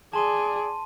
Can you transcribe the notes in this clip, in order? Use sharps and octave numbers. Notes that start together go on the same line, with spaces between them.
G#4 D5 A5 C6 D#7